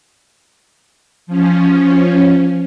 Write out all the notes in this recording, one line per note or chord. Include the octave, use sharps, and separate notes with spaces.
F3 C#4